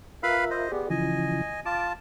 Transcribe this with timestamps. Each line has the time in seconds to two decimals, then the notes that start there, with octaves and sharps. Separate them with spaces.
0.23 F4 A#4 B4 E5 F5 B5
0.50 C5 D#5
0.72 B3 G4 G#4 D5
0.90 C#3 E3 F3 D#5 G#5
1.66 F4 A5 D6